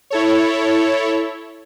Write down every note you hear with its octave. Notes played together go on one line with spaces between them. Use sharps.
E4 A4 C#5